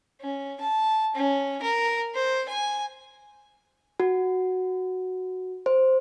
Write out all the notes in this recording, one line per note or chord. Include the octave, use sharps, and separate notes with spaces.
C#4
A5
C#4
A#4
C5
G#5
F#4
C5